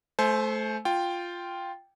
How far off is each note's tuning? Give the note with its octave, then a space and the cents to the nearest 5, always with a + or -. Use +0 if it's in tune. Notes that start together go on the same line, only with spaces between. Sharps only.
A3 -15 C5 +0 G#5 +45
F4 +0 G5 +0